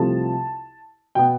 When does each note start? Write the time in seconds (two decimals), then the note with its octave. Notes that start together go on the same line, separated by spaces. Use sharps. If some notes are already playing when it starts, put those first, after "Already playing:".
Already playing: C2 C3 F3 A3 C4 A5
1.15 B2 B3 G5